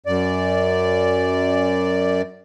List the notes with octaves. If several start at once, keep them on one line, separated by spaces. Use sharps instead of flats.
F#2 D5